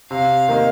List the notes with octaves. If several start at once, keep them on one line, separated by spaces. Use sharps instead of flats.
C3 F5
D#3 A#3 D#4